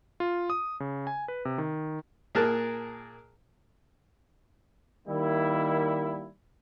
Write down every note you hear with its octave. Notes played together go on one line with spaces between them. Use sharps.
F4
D#6
C#3
G#5
B4
C3
D#3
A#2 A#3 G#4 A#4 A5 F#6
D#3 G3 A#3 E4